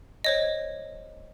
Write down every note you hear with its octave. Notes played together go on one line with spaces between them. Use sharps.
C5 C#5 D#5